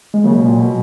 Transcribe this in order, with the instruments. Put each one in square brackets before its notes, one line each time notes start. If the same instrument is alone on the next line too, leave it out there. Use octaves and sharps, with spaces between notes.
[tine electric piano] G#3
[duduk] C#3 [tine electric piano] F#3 A#3
[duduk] B2
A#2
B2